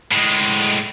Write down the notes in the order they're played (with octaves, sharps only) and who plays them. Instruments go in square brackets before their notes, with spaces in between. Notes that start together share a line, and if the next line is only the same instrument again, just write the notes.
[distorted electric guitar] A2 G#3